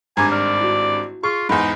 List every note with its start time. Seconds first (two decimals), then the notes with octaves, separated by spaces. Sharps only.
0.17 G#1 G2 G#5 A#5 D6
0.32 D5 F6
0.60 E4 F#4
1.23 F4 G#4 C#6 F6
1.49 E2 G#2 D#4 B5